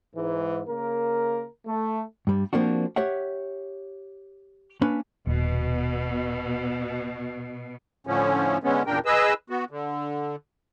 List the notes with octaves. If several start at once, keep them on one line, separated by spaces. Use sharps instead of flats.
G#2 E3
C#3 A#3 A#4
A3
G2 G3
F3 A#3 C4 D4 F#4
G4 C#5 E5 F#5
A#3 C#4 D4 B4
D#1 B2
A2 D3 F3 C#4
D3 G#3 B3 C#4
E2 A#2 C#3 D4 A#4 G5
G#4 B4 D#5 E6
B3 F#4
D3